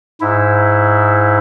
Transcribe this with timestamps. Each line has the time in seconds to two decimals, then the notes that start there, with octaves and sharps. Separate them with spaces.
0.21 G#2 E4